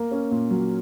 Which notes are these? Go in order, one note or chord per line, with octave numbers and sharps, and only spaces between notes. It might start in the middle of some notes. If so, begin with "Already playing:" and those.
Already playing: A#3 A#4
C#4
A#2
F#3